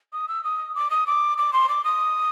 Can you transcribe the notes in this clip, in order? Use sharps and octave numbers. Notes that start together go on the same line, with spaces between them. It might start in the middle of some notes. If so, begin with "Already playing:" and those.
D#6
E6
D#6
D6
D#6
D6
D6
C6
D6
D#6